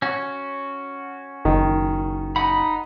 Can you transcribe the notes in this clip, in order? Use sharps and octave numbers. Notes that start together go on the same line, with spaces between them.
C#4 F#4
F#1 D#3
D#4 F#5 B5